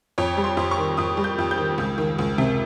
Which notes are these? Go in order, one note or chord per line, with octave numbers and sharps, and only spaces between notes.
F2 C#5
G3
C6
F2
C#6
D#3
F2 D#6
G3
G6
F2
G6
D#3
C#2
D#3
C#2
C3